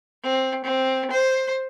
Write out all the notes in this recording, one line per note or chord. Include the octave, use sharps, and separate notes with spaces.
C4
C4
C5